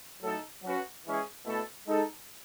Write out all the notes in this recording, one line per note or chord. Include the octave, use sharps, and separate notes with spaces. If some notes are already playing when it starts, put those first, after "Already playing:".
A2 F#3 A3 D#4 A4
F#3 C#4 F#4 B4
E3 G#3 C#4 E4 G#4
B2 A3 E4 A4
G#3 D#4 A4